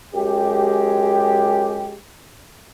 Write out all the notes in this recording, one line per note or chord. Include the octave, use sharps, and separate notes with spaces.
F#2 G#3 G4